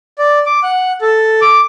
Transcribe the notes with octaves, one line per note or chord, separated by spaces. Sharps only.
D5
D6
F#5
A4
D6